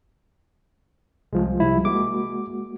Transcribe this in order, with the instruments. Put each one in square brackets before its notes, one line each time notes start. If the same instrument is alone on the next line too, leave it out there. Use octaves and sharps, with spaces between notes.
[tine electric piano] C2 [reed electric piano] F3 G#3
[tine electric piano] C2 E4
[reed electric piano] G#3 A#3 F#4 [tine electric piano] D6